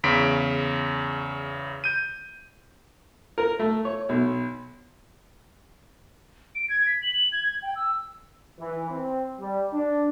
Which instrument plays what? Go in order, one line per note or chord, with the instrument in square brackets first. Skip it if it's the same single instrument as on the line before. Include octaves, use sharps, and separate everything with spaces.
[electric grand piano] E2 C#3 B6 D7
G6 D#7
[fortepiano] A#4
A3
C#5
B1
[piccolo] D7
G#6
B6
F#7
G#6
G#6
G5
E6
[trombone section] E3
C4
G3
D4